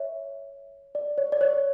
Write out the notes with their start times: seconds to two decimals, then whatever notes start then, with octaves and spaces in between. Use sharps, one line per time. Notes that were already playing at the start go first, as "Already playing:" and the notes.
Already playing: C#5 E5
0.95 D5
1.18 C#5
1.32 D5
1.41 C#5